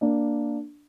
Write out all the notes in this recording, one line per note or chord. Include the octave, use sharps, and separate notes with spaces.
A#3 D4